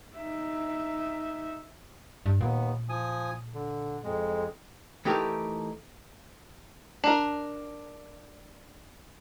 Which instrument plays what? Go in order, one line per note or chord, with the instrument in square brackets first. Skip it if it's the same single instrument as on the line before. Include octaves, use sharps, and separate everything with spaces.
[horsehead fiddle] D#4 E5
[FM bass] G2
[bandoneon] D#2 B3 [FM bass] A#2
[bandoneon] F3 G#5 D#6
D3
F2 G#3
[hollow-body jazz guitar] E3 A3 D#4 G4 A4 A#4
[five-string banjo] D4 A#4